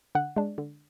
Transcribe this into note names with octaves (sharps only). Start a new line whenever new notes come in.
D3 F#5
G#3 D4
D3